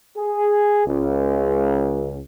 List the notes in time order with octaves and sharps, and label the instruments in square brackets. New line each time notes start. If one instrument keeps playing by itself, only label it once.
[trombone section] G#4
C#2